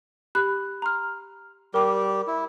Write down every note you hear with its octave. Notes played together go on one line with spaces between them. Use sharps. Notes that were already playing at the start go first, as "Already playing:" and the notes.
G4 B5 F#6
A#5 C6 F6
G3 G4 A#4 D6
E4